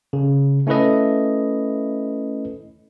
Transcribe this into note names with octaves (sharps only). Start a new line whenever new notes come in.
C#3
A3 C#4 E4 A4 B4 D#5